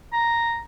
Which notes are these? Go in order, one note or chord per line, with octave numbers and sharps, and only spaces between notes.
A#5